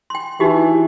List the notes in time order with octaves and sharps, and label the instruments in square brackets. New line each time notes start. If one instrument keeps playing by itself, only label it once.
[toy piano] G5 C6
[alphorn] E3 [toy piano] D#4 F#4 G4